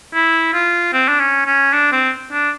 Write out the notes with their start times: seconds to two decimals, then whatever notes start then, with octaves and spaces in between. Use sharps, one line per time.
0.14 E4
0.54 F4
0.93 C4
1.08 D4
1.20 C#4
1.46 C#4
1.73 D4
1.92 C4
2.32 D4